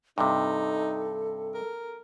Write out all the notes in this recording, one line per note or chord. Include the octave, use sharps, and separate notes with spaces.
G2 C3 D#4 A4
A#4